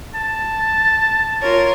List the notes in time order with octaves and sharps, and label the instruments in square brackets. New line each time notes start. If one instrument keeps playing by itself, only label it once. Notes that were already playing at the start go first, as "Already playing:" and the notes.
[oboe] A5
[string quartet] F4 A#4 C#5